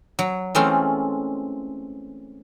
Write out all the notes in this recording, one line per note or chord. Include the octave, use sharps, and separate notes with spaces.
F#3
E3 G#3 A3 C4 C#4 F4